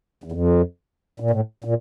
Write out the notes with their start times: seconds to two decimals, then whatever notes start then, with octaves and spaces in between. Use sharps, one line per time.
0.24 E2
0.32 F2
1.20 A#2
1.31 A2
1.64 A#2